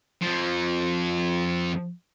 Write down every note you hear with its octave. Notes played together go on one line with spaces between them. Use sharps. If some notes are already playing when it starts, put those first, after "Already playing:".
F2 F3